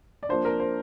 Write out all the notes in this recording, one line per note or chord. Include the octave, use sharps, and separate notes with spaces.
D5
F3 A#3 D4 C5
A#4
C5